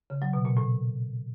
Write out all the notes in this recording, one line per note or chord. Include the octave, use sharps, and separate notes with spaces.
C#3
F#3
B2
A#2
A2